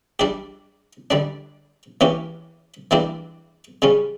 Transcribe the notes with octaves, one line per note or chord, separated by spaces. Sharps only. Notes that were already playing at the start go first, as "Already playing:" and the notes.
G3 D4 G4
D3 G3 D4
E3 A#3 C#4 G4
E3 G3 A#3 D4 G4
C#3 G3 C#4